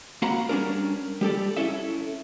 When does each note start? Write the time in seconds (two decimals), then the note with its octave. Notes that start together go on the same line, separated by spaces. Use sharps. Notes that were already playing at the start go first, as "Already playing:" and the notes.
0.22 A#3 F#4 F5 F#5 A#5 B5
0.49 G3 C#4 D4 A#4
1.21 G3 G4 A4 D5
1.57 C#4 E4 A4 E5